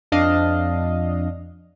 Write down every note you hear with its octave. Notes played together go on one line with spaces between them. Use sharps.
F2 D4 D#5 F5